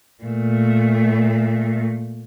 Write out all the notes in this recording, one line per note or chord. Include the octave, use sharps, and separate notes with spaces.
A#2 A3